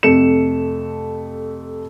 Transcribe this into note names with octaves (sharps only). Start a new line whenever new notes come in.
F2 C3 A3 C#7 E7